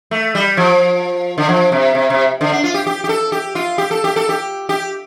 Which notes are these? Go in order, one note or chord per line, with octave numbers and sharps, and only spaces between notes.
A3
G3
F3
D3
F3
C3
C3
C3
D3
D4
F4
G4
G4
G4
A4
G4
F4
G4
A4
G4
A4
G4
G4